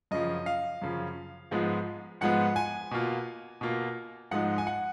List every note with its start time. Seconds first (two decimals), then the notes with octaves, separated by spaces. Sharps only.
0.11 F#2 C#3 F3 D#5
0.46 F5
0.82 F#2 C#3 F3
1.51 G#2 F3 G#3 B3
2.21 G#2 F3 G#3 B3 F#5
2.56 G#5
2.91 B2 A#3 F4
3.61 B2 A#3 F4
4.31 G#2 F3 G#3 D#4 F#5
4.58 G#5
4.67 F#5